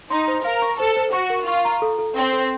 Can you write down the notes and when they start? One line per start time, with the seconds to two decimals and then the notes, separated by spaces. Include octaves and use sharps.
0.11 D#4 C6
0.28 C5
0.45 A#4 F5
0.62 C#6
0.79 A4 C5
0.96 C5
1.13 F#4 C#6
1.30 A#4
1.47 F4 C#6
1.65 A#5
1.82 A4
1.99 A4
2.16 C4 C5
2.33 A4